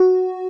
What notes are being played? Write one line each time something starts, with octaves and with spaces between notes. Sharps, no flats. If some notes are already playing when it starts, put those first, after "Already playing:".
Already playing: F#4